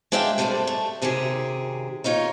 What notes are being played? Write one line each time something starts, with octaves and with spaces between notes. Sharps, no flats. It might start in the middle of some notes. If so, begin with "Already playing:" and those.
G#3 D4 D5 E5 F5 G5
G2 C3 A3 A4 C5 D5
A3
F#2 C3 D#3 G4 G#4
A#3 D#4 F4 C#5